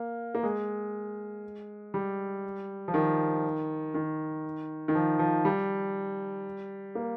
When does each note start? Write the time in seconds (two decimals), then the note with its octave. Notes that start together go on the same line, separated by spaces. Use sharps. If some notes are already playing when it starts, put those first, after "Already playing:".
Already playing: A#3
0.35 A#3
0.43 G#3
1.94 G3
2.88 F3
2.94 D#3
3.94 D#3
4.88 D#3
4.95 F3
5.19 F3
5.45 G3
6.95 A#3